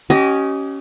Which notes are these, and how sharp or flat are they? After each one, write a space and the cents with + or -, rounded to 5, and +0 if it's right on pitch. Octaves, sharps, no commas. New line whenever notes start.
C#4 +0 G4 -35 D#5 +0